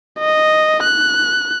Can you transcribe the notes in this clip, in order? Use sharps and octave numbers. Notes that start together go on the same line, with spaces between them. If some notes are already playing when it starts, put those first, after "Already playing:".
D#5
F#6